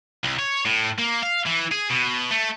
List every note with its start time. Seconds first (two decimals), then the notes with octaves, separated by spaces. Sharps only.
0.23 C2
0.39 C#5
0.66 A2
0.98 A#3
1.23 F5
1.46 E3
1.72 G#4
1.90 B2
2.31 A3